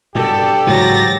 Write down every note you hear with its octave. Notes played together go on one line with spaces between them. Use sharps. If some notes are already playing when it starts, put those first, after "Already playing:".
G2 B2 G4 A4 D5
G#2 C#3 E3 F#3 A6 A#6